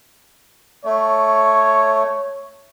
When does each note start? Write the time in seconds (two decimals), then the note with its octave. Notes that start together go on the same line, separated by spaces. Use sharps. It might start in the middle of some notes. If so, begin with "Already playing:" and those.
0.85 A3 C#5